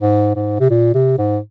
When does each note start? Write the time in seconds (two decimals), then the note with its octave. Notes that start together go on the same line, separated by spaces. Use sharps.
0.01 G#2
0.35 G#2
0.60 C3
0.70 A#2
0.94 C3
1.18 G#2